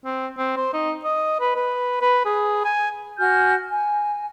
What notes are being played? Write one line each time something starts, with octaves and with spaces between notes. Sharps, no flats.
C4
C4
C5
D#4
D#5
B4
B4
B4
G#4
G#5
F#4 G#5 F6 G6
G#5